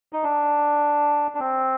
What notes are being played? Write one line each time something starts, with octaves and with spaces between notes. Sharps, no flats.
D#4
D4
D4
C4